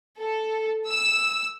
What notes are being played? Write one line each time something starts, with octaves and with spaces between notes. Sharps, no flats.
A4
E6